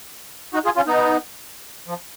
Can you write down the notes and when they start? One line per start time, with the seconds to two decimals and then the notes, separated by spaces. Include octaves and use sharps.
0.54 D#4 F#4
0.65 F4 G#4
0.76 C#4 F4
0.87 B3 D#4
1.87 F3